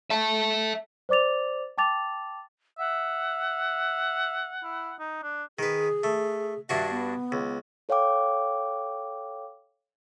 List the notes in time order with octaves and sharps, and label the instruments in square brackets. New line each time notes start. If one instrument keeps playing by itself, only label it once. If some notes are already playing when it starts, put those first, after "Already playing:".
[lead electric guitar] E5 A5
[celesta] C5 D5 D6 A6 F7
G5 A5 D6 A6 F7
[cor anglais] E5 [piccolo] F#5
[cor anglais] E4
D#4
D4
[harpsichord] D#3 B4 [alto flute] G#4
[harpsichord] A3
[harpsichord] G2 D4 F#4 [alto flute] E5
[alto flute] B3
[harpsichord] C#2
[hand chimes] A4 C#5 F5 G5 D6